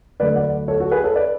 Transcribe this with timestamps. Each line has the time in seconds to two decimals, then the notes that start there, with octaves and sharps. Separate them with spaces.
0.20 D2 D3 F#3 A3 B4 D5
0.36 D5 F#5
0.68 A4 C#5
0.80 F#4 A4
0.91 G#4 B4
1.04 A4 C#5
1.16 B4 D5